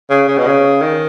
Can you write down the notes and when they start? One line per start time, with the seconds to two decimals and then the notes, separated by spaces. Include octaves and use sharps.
0.10 C#3
0.28 C#3
0.37 B2
0.46 C#3
0.81 D#3